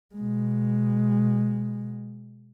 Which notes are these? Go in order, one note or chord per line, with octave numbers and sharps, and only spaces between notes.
B2 G#3